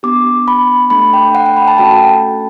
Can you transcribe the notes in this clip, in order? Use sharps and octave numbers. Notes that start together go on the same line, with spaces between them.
B3 D4 G4 D6
B5
A3 D4 A4 B5
G5
F#5
G5
B5
A5
A3 C#4 F#4 A4 G5